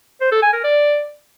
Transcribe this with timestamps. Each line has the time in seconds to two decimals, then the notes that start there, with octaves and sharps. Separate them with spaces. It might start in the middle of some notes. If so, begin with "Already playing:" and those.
0.21 C5
0.32 A4
0.42 G#5
0.53 A#4
0.64 D5